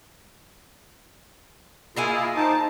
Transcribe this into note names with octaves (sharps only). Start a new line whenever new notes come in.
A#3 E4 F4 G#4 D#5 F5 G#5
D#4 C5 A5 D6